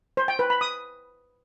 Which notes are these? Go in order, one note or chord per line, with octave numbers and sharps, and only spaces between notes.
C5
G5
B4
B5
D#6